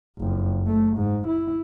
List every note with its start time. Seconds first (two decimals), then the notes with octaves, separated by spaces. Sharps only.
0.19 F#1 F2
0.67 A3
0.97 G#2
1.28 E4